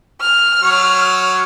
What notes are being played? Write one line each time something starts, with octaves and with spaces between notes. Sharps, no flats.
F6
F#3 C#5